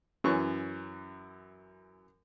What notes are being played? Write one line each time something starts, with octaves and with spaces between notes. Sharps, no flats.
F#2 E3 C#4 C#6